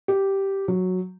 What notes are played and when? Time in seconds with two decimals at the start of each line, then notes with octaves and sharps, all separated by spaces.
0.08 G4
0.68 F#3